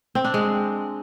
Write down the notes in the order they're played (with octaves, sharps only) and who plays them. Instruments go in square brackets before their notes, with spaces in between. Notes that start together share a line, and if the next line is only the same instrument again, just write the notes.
[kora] C4
D4
G#3